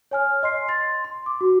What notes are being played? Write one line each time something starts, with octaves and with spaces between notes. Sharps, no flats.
C#5 G#5 F6
D#5 C6 C7
C6 A6
C6
D6
F#4